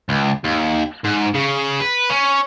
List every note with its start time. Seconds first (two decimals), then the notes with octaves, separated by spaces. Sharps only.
0.09 C#2
0.44 D#2
1.04 G#2
1.34 C#3
1.80 B4
2.10 C#4